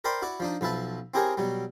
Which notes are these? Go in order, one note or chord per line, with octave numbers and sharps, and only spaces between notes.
A#4 C5 D5 G5 B5 C6
E4 F#4 D5
F3 D4 D#4
B1 F3 B4 E5 A5
C4 E4 G4 G#4 A#4 C#5
B2 F#3 G3